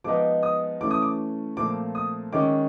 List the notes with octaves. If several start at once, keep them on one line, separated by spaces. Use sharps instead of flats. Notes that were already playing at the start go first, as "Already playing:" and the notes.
F3 G#3 B3 D#4 D6
D#6
E3 A3 C#4 D6
D#6
D6
A#2 F3 A3 C4 D6
D#6
D#3 G#3 C#4 D6